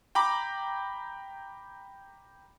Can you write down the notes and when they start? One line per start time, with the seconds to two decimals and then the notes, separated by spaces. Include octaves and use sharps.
0.15 G5 A#5 B5 D6